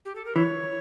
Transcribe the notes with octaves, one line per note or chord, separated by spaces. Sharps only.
G4
A4
A#4
E3 C#5